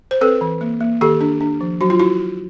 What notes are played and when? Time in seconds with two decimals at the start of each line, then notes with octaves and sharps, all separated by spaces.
0.11 C5
0.21 C4 A4 B4
0.41 E3
0.61 A#3
0.80 A#3
1.01 D#3 G4 A4
1.21 D4
1.41 D4
1.61 F3
1.81 F#3 F#4
1.90 F4
1.99 E4 F#4